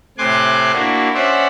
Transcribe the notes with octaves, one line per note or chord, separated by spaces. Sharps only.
A2 C3 G#5 C6 D6 F#6
A#3 D4 E4 F#4
C#4 C5 D5 E5 F#5